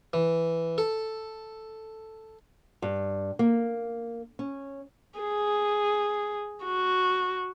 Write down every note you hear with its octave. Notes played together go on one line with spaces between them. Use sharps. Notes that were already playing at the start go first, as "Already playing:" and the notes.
E3
A4
G2
A#3
C#4
G#4
F#4